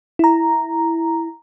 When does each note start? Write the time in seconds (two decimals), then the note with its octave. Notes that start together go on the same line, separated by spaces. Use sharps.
0.19 E4 A#5